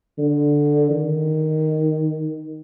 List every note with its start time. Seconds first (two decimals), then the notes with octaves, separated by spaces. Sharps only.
0.18 D3
0.90 D#3